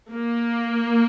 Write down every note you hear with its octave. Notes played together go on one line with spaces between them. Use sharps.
A#3